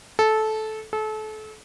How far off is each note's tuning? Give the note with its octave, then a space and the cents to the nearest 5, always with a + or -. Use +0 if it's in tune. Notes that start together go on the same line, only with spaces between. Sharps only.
A4 -15
A4 -30